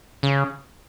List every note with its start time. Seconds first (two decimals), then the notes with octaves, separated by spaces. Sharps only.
0.23 C#3